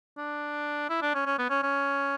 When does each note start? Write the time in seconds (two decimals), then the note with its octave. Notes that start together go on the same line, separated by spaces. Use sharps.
0.17 D4
0.90 E4
1.02 D4
1.15 C#4
1.26 C#4
1.39 B3
1.50 C#4
1.63 C#4